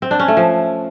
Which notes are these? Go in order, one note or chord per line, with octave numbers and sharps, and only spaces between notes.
C4
D4
C#4
A3
F3